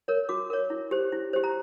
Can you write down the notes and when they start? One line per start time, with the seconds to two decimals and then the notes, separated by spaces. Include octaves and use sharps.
0.08 A#4 C#5
0.29 F#4 D6
0.50 A#4 C#5
0.70 E4
0.91 G4 C5
1.12 E4
1.33 G4 C5
1.44 A#5